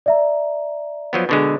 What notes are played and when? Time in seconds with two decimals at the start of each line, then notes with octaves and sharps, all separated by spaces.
0.06 D5 E5 A#5
1.13 F3 F#3 B3
1.29 B2 D3 G#3